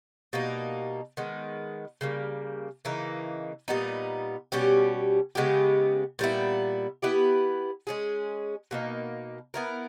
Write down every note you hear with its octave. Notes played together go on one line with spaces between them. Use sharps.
B2 G3 A#3 D#4
D#3 G#3 B3
C#3 G3 A#3
C#3 E3 A#3 D#4
A#2 G3 B3 D#4
B2 G3 C#4 G4
C#3 G#3 B3 G4
A#2 G3 B3 E4
B3 E4 G4 B4
G#3 C#4 G#4
B2 A#3 D#4
B3 E4 A#4